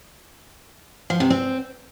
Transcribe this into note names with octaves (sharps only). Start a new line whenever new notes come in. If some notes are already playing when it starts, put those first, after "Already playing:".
F3
C3
C4